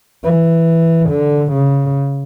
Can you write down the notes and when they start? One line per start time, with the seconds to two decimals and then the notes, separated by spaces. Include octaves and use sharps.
0.24 E3
1.10 D3
1.53 C#3